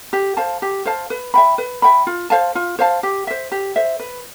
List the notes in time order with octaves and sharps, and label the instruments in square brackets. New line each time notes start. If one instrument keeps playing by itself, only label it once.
[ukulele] G4
C5 F5 A5
G4
C5 F5 A5
B4
E5 G5 B5
B4
E5 G5 B5
F4
C5 F5 A5
F4
C5 F5 A5
G4
C5 E5
G4
C5 E5
B4